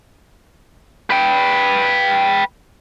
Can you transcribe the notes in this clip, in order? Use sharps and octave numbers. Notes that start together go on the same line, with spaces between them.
B4 G5